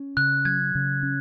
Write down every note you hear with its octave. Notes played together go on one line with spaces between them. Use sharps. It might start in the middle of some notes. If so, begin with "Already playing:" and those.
Already playing: C#4
C#3 F#6
F#3 G#6
C#3
C#4